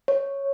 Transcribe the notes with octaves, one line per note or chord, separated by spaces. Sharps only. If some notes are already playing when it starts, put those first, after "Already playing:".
C#5